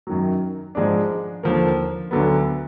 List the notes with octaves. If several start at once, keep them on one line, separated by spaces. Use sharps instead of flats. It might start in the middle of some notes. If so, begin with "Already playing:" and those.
F#2 D#3 F#3
G#2 F3 G#3 D4
D#2 D3 F3 A#3
D2 D3 F#3 B3